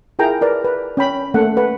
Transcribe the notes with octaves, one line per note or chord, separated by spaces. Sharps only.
E4 F4 G#4 A#4 G5 A#5
A#4 B4 D5
B4
C#4 G5 B5
A3 A#3 C#4 A4 F#5
B4 F#5